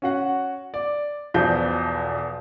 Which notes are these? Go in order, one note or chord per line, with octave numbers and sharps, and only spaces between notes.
C#4 F#4 F#5
D5
B1 E2 B2 F3 D5 G6